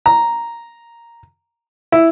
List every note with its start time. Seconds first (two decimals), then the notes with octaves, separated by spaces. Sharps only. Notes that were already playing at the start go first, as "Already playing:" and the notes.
0.06 A#5
1.92 E4